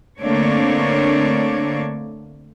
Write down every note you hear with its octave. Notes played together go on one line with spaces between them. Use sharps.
D3 A3 A#3 C4 D4 C#5